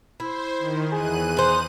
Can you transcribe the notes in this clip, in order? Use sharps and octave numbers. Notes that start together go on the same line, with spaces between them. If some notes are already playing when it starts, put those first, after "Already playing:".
E4 C5
D#3
E2 G#4 F#6 D#7
D#4 C5